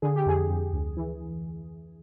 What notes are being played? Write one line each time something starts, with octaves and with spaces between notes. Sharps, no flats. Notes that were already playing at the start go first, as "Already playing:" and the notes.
D3 G#4
G4
F2 G#4
F2
D2
E3